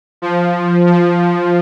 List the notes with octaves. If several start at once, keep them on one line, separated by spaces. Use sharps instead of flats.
F3
F3